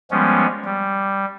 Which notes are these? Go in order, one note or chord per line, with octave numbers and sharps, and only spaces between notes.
F3 G3 G#3 B3 C#4
G3